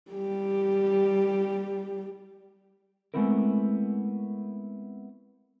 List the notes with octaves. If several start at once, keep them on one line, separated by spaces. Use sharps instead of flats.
G3 G4
G#3 A3 B3 C4 E4 A#4